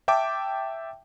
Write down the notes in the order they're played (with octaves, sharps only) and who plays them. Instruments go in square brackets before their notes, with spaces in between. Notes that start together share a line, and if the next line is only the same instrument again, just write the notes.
[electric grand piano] E5 G5 A5 D6